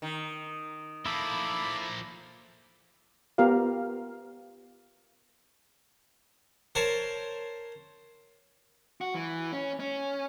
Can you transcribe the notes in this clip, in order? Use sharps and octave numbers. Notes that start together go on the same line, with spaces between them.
D#3
F3 A#3 E4 A4 B5 D6
B3 F4 G4 A#4 F5
A#4 C5 C#5 A5
F#4
E3
C#4
C#4